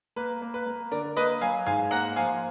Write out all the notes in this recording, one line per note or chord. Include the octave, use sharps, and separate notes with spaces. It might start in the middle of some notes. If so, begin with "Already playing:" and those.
A#3 B4
A#3
B4
A#3
D3 A#4 D5
A#3 B4 D#5
F#3 F5 G#5
G#2 F5 G#5
A#3 F#5 A#5
F3 F5 G#5